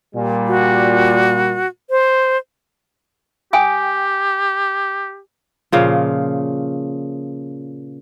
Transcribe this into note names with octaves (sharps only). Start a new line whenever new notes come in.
A#2 G3
F#4
C5
G4 G5 G#5 D#6
A#2 C#3 F3 F5